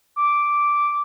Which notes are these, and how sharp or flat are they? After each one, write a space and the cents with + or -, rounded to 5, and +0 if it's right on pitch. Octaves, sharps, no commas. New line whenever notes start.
D6 -5